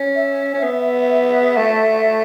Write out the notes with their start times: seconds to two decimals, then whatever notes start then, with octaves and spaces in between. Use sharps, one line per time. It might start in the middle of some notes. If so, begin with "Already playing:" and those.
Already playing: C#4
0.15 E5
0.54 C#4
0.63 B3
1.57 A3